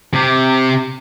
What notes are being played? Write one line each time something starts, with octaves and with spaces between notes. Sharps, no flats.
C3 G4